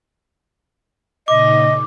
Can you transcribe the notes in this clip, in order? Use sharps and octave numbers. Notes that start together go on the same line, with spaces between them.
A#2 C#3 D#4 D#5 D6